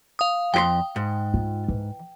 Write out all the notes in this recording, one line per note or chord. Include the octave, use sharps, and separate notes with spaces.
F5 D#6
F2 G4 G5 C6
G#2
F4
E3